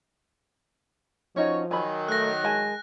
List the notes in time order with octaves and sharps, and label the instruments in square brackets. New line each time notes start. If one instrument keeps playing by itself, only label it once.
[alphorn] F3 [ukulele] C#4 D#4 F#4 [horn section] C#5
[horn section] D#3 F#3 [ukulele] G#5 B5
[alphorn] A3 [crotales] F#6 A#6
[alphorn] G#3 [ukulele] A#4 G#5 A5